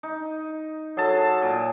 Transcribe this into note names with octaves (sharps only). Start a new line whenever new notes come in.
D#4
F#3 G#4 A4 A5
A#2